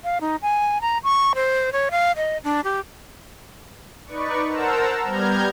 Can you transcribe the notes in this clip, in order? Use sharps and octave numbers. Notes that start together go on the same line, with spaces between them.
F5
D#4
G#5
A#5
C#6
C5
C#5
F5
D#5
D4
G4
D#4 B4 D5 C#6
A#4 C5 F#5 A5 A#5 E6
G3 B3 A#5 F6 G6 G#6